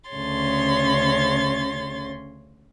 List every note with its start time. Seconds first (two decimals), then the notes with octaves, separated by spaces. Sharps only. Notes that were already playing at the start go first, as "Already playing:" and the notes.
0.10 D2 C#3 C#4 C#5 C6 A6